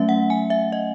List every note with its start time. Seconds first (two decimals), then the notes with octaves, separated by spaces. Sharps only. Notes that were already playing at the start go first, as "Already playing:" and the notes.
Already playing: F#3 A3 C#4 E5
0.09 F#5
0.30 G#5
0.50 E5
0.72 D#5